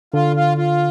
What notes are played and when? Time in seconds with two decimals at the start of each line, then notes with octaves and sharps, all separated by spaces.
0.14 D3 F4
0.36 F4
0.58 F4